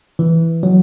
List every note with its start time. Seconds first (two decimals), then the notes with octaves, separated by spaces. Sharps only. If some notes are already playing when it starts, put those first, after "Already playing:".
0.19 E3
0.63 F#3